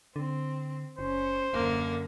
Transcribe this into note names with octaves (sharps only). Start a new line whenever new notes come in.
D3 C4
F#1 C#4 C5
D#1 F#2 D3 A#3